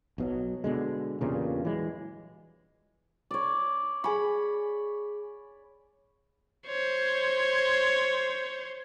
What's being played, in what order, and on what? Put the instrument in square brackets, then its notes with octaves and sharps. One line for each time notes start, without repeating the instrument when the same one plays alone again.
[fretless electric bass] B1 B2 F#3
B2 D3 G#3
E2 G2 A#2 C#3
E3 F#3 G#3
[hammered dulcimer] C#5 D5
[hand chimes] G#4 G#5 C#6 [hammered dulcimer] B5
[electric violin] C5 C#5